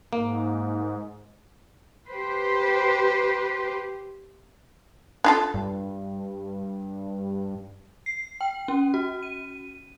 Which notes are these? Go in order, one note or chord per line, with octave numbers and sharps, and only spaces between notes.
G#2 A#3
G4 B4 C5
D4 F4 A4
G2
C7
G5
C#4
F#4
D#7